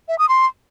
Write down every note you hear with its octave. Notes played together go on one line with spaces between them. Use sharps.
E5
D#6
C6